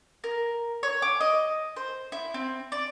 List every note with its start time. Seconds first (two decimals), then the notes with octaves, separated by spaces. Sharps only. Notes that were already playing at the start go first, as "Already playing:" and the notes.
0.24 A#4
0.83 C#5
1.02 D6
1.20 D#5
1.76 C5
2.12 E4
2.34 C4
2.72 D5